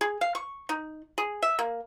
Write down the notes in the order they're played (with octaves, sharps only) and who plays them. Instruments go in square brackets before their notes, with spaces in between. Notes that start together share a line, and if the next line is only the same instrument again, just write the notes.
[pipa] G#4
F5
C#6
D#4
G#4
E5
A#3